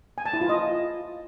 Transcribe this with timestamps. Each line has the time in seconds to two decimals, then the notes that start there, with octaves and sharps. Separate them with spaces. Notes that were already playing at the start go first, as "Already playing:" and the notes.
0.18 G#5
0.26 A5
0.33 E4
0.41 F4
0.49 D#5